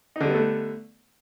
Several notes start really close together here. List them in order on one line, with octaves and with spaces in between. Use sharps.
D#4 D3 G3 B3 A3